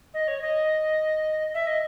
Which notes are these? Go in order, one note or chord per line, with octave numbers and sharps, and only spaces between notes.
D#5
C#5
D#5
E5
D#5